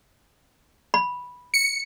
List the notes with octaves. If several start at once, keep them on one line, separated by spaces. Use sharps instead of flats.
B5
C#7